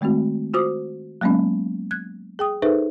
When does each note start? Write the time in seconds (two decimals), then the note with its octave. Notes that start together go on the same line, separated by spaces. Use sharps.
0.01 D#3 G#3 A3 C4 F#4
0.54 F4 F#4 C5 D6 D#6
1.21 F#3 G#3 A#3 B3 C#4
1.91 F#6 G#6
2.39 G#4 G5 D#6
2.62 D#4 G#4 A4 B4 C5 E5